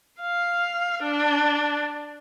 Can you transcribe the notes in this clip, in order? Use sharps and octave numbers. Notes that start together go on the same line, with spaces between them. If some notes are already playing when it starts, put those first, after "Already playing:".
F5
D4